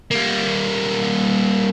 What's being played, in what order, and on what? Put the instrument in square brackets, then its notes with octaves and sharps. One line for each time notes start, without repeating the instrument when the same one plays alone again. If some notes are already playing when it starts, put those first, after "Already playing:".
[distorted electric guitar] G3 A#3